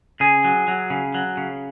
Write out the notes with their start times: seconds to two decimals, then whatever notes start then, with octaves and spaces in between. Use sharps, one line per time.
0.20 C#3 G#4
0.44 F#3
0.68 F#3
0.90 C#3
1.14 F#3
1.37 C#3